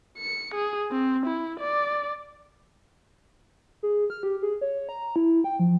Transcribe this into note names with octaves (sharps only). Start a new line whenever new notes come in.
C#7
G#4
C4
E4
D5
G#4
F6
G4
G#4
C#5
A#5
E4
G5
F3